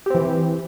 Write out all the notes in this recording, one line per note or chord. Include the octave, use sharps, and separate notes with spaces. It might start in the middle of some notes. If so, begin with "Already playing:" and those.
E3 C4 G4